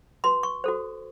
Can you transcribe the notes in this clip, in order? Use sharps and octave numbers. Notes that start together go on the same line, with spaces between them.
F#4 B4 C6
C#6
F#4 A4 C5